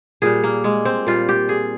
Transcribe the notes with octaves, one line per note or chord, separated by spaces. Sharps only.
A#2 G3 G#4
A#3
G#3
C4
A#2 G3 F4
G4
G#4